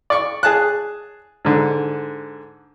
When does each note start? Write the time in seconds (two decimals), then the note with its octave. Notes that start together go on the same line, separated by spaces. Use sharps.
0.10 D5 C#6
0.43 G#4 A5 F#6
1.45 G#2 D3